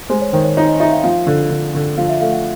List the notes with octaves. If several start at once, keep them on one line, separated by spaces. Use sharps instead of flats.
G#3 C5
C#5
D#3 C5
C#5
D#4 C#5
D#5
D#4 E5
F5
F3 F5
D3
D3
D3
F3 F5
E5
A3 F5
F#5